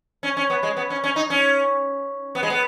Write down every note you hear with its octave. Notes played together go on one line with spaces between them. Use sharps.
C#4
C#4
B3
G#3
B3
C#4
C#4
D#4
C#4
B3
G#3
B3